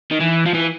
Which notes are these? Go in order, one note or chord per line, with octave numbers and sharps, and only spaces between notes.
D#3
E3
F3
E3